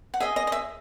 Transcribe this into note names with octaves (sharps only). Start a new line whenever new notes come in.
F#5
G#4 D#5 E5
D#5
D#5
E5